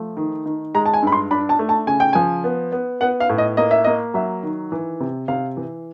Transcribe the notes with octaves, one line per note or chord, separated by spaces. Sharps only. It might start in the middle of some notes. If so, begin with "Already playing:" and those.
Already playing: F3 A3
D#3
D#3
G#3 A#5
A5
G#5
G2 B5
C6
D4 B5
A5
A3
A5
C#3 G#5
G5
F3 G#5
B3
B3
B3 F#5
F5
A2
D#5
A#3 D#5
E5
A#3 D#5
F#3 E5
D#3
E3
C3
C3 F5
E3